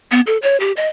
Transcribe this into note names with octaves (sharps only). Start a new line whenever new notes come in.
B3
A4
C#5
G4
D#5